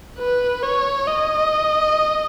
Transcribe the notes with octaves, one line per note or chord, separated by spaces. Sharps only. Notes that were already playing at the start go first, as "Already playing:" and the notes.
B4
C#5
D#5